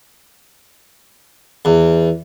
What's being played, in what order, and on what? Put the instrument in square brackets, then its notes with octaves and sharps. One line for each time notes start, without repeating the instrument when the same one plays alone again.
[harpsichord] E2